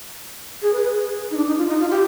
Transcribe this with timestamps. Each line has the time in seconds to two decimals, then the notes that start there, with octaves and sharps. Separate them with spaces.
0.62 G#4
0.73 B4
0.83 B4
0.94 G#4
1.31 D#4
1.37 D4
1.47 D#4
1.58 F4
1.68 D#4
1.80 F4
1.90 G4